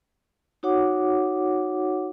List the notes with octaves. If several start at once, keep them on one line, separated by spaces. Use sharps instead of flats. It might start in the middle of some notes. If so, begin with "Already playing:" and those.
D#4 F#4 C#5 F#5 D6